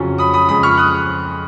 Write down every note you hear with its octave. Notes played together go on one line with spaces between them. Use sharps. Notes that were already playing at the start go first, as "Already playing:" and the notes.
Already playing: F2 C#3 F#3 C#4
B5 D#6
B5 D#6
F2 C#3 G#3 B5 D#6
C#6 F6
D#6 F#6